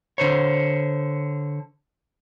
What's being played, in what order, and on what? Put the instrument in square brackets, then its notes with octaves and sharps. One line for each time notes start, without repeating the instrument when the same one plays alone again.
[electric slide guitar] D3 C5 C#5